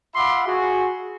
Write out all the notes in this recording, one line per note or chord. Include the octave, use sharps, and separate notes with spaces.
F4 E5 F#5 B5 C6 D6
F#4 G#4